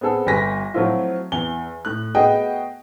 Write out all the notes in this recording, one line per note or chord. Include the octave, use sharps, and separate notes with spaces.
B3 C4 G#4 A4
G1 G4 B4 G#5 A#6 B6
F3 F#3 A3 C4 E4 F4
E2 G7
A2 F#6
A3 B3 F#4 G#4 D#5 G5